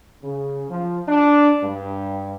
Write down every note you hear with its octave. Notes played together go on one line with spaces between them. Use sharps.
C#3
F3
D4
G2